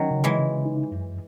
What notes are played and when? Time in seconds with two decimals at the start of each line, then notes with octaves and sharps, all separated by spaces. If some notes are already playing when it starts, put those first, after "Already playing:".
Already playing: D#3 F#3 C#4
0.11 C#3
0.24 E3 G#3
0.38 C#3
0.65 D#4
0.91 F#2